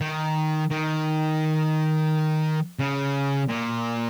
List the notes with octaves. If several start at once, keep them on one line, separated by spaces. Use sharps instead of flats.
D#3
D#3
C#3
A#2